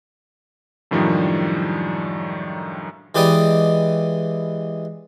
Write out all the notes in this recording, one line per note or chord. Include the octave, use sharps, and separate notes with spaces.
F#2 A2 D#3 F3 G3 D4
E3 G#3 G4 B4 D5 D#5